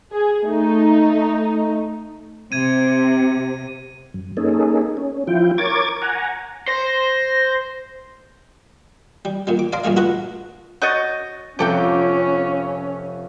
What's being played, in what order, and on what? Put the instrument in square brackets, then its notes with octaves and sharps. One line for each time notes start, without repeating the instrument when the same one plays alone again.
[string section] G#4
A3 D#4
[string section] C3 [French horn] C4 [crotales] G#6 D#7
[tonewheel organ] F#2
A#3 C#4 D#4 G#4 A4
C#4
F3 E4 F4 G5
A#4 C#5 D6 G#6 A6
F#5 G#5 A#5
[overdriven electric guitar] C5 [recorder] A#6
[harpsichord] G3
A#2 D3 G3
D6
D5 D#5 F5 A5 C6 D6
A#1 G2 A3 G#4 F5
F4 F#4 A4 B4 D#5 F#5
[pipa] F#4 C#5 D#5 [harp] G6 A6 A#6
[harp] F1 F2 D6 [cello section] C#4 [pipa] G4 A4 G5